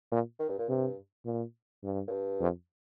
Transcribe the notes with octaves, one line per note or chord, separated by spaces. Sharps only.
A#2
D#3
G2
A#2
G2 C3
A#2
G2
A#2
G2
F2